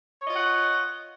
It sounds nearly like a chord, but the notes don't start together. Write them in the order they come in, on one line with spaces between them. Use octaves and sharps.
C#5 D#5 F4 F#5